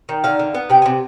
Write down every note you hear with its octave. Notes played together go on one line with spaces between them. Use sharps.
D#3
D3 F5
D3
B3
C3 G5
G#5
C3